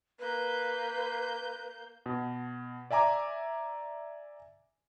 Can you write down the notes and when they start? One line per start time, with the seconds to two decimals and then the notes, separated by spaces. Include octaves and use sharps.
0.20 A#3 B4 G6
2.06 B2
2.91 D5 E5 G#5 A#5 D6